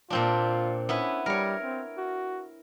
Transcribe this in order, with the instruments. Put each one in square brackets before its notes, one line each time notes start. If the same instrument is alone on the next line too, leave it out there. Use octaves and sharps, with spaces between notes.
[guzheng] A#2 C4 D4 [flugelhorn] F4
[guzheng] B3 E4 B4 [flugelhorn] C#4
[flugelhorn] G3 [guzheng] A#4 C#5
[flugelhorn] C4
F#4